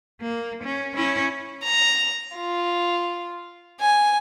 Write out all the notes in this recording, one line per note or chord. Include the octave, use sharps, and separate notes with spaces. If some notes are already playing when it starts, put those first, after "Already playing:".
A#3
C#4
C#4 E4
A#5
F4
G#5